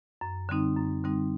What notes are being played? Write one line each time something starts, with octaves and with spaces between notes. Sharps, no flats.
F#2
D3 G3 C4 D#4
F#2
D3 G3 C4 D#4